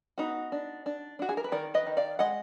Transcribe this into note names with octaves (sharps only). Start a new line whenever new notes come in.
B3 D#4 F#4
D4
D4
D4 F#4
G#4
A#4
B4
D#3 A#4 D5
B4 D#5
D#3
D5 F5
G#3 D#5 F#5